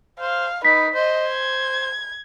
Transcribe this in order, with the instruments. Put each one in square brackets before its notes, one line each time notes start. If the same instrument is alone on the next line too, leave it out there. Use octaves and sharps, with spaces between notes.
[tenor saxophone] C5 [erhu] F5
[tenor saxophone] D#4 [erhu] B4 [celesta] B6
[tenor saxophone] C5 [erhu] D#5
[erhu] G#6